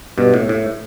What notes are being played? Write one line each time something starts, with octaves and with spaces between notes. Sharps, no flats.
G2 B2
A2
A2